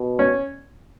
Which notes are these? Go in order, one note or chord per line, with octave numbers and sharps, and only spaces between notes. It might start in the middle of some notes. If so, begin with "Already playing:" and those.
Already playing: B2
C#4